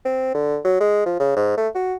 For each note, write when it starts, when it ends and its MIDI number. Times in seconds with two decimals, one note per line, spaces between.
0.05 0.31 60
0.34 0.58 50
0.65 0.78 54
0.80 1.06 56
1.06 1.17 53
1.20 1.31 49
1.36 1.57 44
1.57 1.68 57
1.75 1.95 66